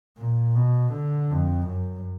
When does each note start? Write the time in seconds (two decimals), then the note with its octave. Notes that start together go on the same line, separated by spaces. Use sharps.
0.18 A#2
0.55 B2
0.92 D3
1.30 F2
1.67 F#2